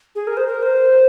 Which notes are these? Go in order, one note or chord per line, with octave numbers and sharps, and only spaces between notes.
G#4
A#4
C5
A#4
C5